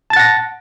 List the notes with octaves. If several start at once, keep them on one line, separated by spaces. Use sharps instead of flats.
F#5 A5 A6 A#6